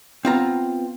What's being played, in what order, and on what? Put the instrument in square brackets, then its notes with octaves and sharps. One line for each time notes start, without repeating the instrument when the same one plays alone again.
[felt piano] B3 [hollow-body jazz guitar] C4 F4 A#5